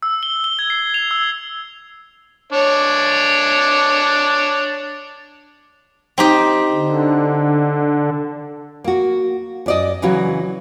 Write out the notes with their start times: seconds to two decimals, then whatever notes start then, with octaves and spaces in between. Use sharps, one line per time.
0.03 E6
0.23 G7
0.44 G7
0.59 G#6
0.70 C7
0.94 F7
1.11 E6
2.52 D4 C#5
6.18 C4 D#4 G4
6.73 D3
8.84 A#3 F#4
9.66 F#2 D5 D#5
10.02 C#3 E3 F#3 F#4